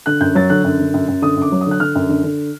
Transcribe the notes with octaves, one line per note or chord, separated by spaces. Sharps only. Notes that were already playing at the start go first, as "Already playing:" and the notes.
D3 F#6
F#2 G6
F#3 A6
D3 F#6
F#2
D3
F#2
F#2
D3 D#6
F#2 D6
F#3
D#6
D3 F#6
D3 F6
F#2
D3
D3